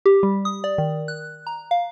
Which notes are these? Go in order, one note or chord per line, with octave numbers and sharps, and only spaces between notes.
G4
G3
D#6
D5
D#3
F#6
A#5
F5